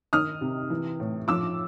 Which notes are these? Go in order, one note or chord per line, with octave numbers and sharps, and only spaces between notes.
D#3 D#6 F6
C3
E3
A2
F3 D6 E6